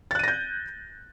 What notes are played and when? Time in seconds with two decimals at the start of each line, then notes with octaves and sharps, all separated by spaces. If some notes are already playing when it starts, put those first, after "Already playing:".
0.11 A6
0.15 F#6
0.19 D#7
0.24 A#6
0.28 G6